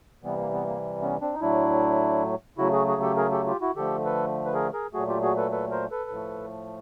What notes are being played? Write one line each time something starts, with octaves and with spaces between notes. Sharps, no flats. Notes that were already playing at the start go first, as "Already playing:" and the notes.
C3 E3 G3 B3
A#3
B3
A#3
B3 C#4
C4 D4
D#4
A2 F#3 A3 D4 E4
C#3 F#3 A3 E4 F#4
F#4 G#4
F#4 G#4
G4 A4
G#4 A#4
G4 A4
F4 G4
E4 F#4
D3 F3 A3 G4 A4
A4 B4
B4
G#4 A#4
G#4 A#4
A#2 F#3 A3 F#4 G#4
F4 G4
F#4 G#4
A4 B4
A4 B4
A#4 C5
A4 B4
A2 F3 A3